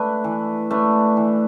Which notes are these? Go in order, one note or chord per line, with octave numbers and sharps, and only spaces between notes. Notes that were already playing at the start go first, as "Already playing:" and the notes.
Already playing: A3 D4 B4
E3
A3 D4 B4
E3